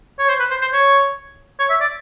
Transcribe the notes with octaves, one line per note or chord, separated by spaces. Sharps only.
C#5
C5
B4
C5
C5
C#5
C#5
E5
D5